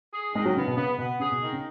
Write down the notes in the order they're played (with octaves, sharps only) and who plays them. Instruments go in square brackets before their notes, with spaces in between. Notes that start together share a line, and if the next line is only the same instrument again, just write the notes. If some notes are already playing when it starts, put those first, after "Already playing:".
[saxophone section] G#4
[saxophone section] D#3 [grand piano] G#3
[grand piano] F#3
[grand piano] C#3 [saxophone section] B3
[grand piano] B2
[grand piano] C#3 [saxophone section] B3
[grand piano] B2 [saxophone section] B3
[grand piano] C#3 [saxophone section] G#4
[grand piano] B2
[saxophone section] D#3
[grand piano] C#3